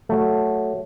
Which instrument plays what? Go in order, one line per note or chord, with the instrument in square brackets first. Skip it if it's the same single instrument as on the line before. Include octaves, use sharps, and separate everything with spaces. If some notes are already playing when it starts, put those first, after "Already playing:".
[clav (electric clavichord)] F#3 A3